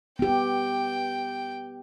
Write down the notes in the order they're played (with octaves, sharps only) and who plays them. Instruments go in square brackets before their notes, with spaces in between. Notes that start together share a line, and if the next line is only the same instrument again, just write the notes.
[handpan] B3 G4 [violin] G5